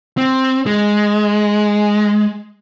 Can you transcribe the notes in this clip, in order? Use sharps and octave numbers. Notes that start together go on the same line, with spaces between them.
C4
G#3